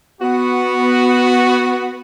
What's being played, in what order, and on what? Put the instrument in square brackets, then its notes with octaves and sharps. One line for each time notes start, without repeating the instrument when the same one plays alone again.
[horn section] B3 F#4